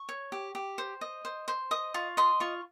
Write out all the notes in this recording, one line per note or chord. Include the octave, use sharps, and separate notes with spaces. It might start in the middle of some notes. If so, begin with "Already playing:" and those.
Already playing: C#6
C#5
G4
G4
C5
D#5
C5
C5
D#5 D#6
F4 C#6
D#5 C6
F4 C#6